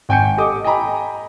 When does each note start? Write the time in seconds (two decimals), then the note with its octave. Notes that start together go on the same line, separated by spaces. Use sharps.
0.09 G#1 G5 G#5 G6 C#7
0.37 G4 A4 D#5 D6 D#6
0.64 D#5 G5 G#5 A#5 B5